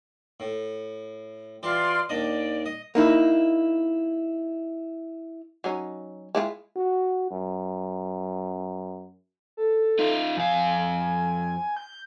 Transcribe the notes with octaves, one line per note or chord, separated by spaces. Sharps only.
A2
E3 F4 G4 D5 C6
D#2 D4 D5 D#5
D#5
A#3 D#4 E4
F#3 C#4 D#4
G#3 E4 F4
F#4
F#2
A4
D#4 F4
F2 F5 G#5
G6